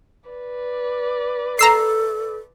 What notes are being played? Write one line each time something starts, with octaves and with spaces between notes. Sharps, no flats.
B4 D5
A4 A#5 E6 C7